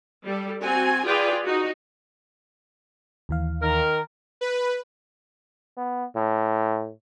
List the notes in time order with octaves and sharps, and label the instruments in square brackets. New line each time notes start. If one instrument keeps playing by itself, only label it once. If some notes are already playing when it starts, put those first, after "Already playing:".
[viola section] G3 A4
C4 F#4 G#5
F4 G#4 B4 D5 G5
D#4 F#4
[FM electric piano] D#2 E3 F5
[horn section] D#3 A#4
[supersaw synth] B4
[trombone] B3
A2